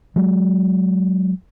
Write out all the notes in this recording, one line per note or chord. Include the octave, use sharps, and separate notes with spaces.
F#3 G#3